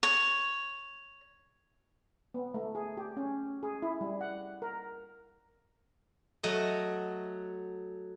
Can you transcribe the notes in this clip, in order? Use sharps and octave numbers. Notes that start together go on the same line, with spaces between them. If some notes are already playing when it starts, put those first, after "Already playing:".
C#5
B3
A3
G#4
G4
C#4
G#4
E4
G3
F#5
A#4
F#3 A3 D#5